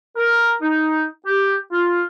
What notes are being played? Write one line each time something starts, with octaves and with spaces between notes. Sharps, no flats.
A#4
D#4
G4
F4